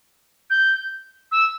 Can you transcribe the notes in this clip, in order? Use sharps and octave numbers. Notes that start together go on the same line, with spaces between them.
G6
E6